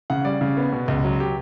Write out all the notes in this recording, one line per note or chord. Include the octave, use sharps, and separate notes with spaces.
C#3 F#5
G3 D5
C#3
B3
B2
C#2
F#3
G4